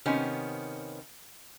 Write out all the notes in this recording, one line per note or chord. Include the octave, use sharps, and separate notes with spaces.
C3 D#3 B3 C#4